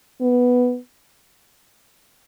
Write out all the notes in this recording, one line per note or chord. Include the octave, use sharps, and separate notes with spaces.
B3